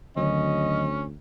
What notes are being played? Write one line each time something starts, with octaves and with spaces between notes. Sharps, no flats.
D2 D3 D#3 F#3 C#4 D#5